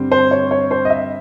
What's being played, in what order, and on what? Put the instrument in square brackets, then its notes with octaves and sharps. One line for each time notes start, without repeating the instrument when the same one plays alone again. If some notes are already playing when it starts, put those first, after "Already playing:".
Already playing: [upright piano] G2 D3 G3 C4
C5
C#5
C#5
C5
D#5
E5